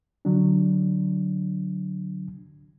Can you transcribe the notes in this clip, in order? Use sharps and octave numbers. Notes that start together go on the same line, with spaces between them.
D3 F#3 D4